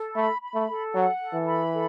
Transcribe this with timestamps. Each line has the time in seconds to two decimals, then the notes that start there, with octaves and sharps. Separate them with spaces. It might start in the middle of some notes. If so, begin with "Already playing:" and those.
Already playing: A4
0.15 A3 B5
0.42 B5
0.54 A3
0.67 A4
0.94 F#3 F#5
1.20 A4
1.33 E3
1.46 B5
1.73 A4